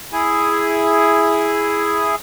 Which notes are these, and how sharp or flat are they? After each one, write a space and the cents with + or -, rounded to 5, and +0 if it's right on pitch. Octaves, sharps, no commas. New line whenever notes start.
E4 +0 G#4 +0